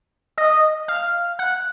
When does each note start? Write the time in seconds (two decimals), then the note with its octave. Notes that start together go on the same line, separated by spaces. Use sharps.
0.38 D#5
0.88 F5
1.39 F#5